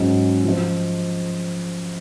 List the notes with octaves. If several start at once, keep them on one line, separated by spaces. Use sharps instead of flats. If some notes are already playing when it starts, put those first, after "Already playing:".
Already playing: G#2 F#3 C#4
F3 C4 F4 C5